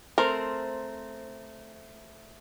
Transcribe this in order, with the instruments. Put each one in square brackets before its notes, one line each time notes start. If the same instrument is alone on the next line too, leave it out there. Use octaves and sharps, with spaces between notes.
[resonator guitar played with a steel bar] A3 C4 C5 [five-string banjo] A#4